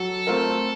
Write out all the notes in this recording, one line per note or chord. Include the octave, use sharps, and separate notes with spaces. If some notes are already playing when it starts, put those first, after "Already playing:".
Already playing: F#3 A4
A3 C4 F4 A#4